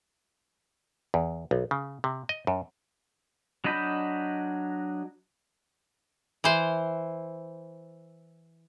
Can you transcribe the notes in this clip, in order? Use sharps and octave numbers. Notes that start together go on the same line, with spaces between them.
E2
B1
C#3
C3
D#5
F#2
F#3 D4 D#5 B5 G6
E3 C5